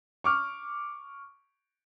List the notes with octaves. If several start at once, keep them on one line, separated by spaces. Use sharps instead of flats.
C#6 D6 F6